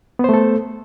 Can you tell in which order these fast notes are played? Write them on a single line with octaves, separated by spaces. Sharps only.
B3 C5 A3 A4